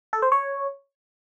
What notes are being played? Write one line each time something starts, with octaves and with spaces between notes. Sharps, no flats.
A4
C5
C#5